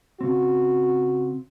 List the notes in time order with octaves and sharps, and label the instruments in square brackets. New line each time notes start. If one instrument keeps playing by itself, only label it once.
[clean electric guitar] C#3 C4 [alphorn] F#4